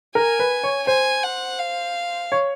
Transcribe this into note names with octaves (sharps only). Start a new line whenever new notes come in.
A#4 G#5
B4
C#5
C5 G#5
F#5
F5
C#5